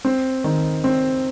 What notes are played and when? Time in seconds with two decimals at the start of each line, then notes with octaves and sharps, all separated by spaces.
0.05 C4
0.44 D#3
0.84 C4